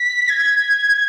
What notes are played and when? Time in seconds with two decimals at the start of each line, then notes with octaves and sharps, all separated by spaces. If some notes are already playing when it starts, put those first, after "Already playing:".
Already playing: B6
0.29 G#6